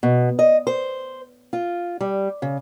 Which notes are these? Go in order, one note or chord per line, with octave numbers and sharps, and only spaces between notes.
B2
D#5
C5
F4
G3
C#3